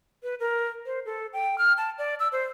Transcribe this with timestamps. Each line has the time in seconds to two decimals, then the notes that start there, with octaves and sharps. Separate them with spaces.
0.23 B4
0.40 A#4
0.86 C5
1.06 A4
1.33 G5
1.58 F6
1.78 A5
1.98 D5
2.20 E6
2.32 C5